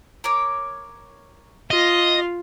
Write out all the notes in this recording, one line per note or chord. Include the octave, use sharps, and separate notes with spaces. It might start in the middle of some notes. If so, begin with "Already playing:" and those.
A#4 C#5 D6
F4 D#5